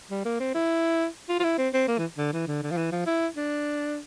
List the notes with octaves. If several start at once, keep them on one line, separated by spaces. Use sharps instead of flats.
G3
A#3
C4
E4
F4
F4
E4
C4
C4
A#3
E3
D3
E3
D3
D3
F3
E3
F3
E4
D4